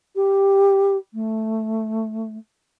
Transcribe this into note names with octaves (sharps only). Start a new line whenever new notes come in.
G4
A3